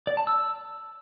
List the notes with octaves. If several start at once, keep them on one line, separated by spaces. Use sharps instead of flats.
D5
A5
E6